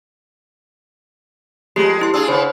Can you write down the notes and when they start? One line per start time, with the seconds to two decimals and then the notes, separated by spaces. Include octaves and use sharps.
1.76 F2 G#3 A3 G4
2.01 E4 C6
2.14 D4 F4 G#4 C6 E6
2.28 C#3 B3 C5 C#5